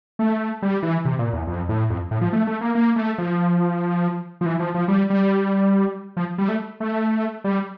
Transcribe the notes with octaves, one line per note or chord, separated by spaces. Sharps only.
A3
G3
E3
C3
A#2
E2
F2
A2
F2
A2
F3
A3
A3
A#3
A#3
A3
F3
F3
E3
F3
F3
G3
G3
F3
G3
A3
A3
G3